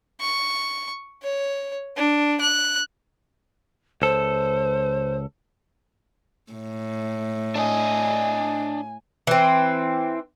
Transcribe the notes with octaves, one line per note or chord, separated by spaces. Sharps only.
C#6
C#5
D4
F#6
C#2 A4 C5
A2
D4 D#5 G#5
E3 C4